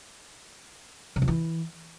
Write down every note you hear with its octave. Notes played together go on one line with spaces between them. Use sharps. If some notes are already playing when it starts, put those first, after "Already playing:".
C3
F2
E3